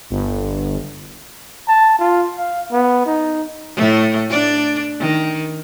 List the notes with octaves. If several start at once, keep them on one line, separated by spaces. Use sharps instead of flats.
G1
A5
F4
F5
B3
D#4
A2 A3
D4 D5
D#3